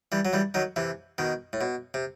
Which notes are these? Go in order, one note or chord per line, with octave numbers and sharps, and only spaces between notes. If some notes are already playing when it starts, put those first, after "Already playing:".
E3 G3
F#3
E3 G3
D#3 F#3
C3 E3
B2 D#3
A2
B2
C3